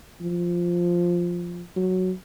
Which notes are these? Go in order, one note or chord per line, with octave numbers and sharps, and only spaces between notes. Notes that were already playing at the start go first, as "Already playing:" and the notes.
F3
F#3